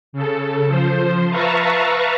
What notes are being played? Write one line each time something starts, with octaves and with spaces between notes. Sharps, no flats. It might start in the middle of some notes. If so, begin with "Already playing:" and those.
C#3 A4
F3 C5
B4 E5 F5 A5 A#5 C#6